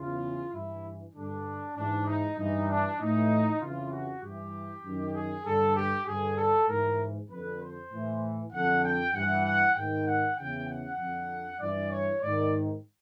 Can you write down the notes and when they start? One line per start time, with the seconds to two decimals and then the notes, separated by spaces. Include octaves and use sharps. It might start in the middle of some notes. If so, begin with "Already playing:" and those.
Already playing: E2 C#3 E3 F4
0.53 G2 E3 E4
1.14 G2 D3 D4
1.76 G#2 E3 D4
2.07 D#4
2.38 G2 E3 D#4
2.69 D4
2.99 A2 E3 D#4
3.61 F2 C#3 E3 F4
3.92 F#4
4.22 G2 E3 G4
4.84 F#2 D#3
5.14 G#4
5.45 G2 D3 A4
5.75 G4
6.07 G2 D3 G#4
6.38 A4
6.68 G#2 E3 A#4
7.30 F2 D3 B4
7.61 C5
7.91 A2 E3
8.53 F2 D3 F#5
8.83 G5
9.14 G2 E3 F#5
9.45 F#5
9.75 G#2 D#3 G5
10.06 F#5
10.37 E2 C#3 E3 G5
10.68 F#5
10.99 F2 D3
11.60 G2 E3 D5
11.91 C#5
12.22 G#2 D#3 D5